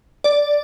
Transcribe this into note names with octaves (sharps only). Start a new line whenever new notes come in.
D5